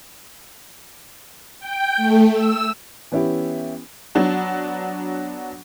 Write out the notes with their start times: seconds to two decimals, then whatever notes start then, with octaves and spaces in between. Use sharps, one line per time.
1.59 G5
1.97 A3
2.32 E6
3.12 E3 B3 C#4 E4 G4
4.15 F#3 B3 D4 F#4